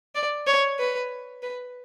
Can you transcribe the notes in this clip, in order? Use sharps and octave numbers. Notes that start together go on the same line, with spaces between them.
D5
C#5
B4
B4